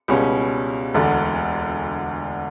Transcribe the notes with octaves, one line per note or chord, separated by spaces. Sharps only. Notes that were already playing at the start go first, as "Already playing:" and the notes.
C#2 B2 G3 C#4
E1 D2 D3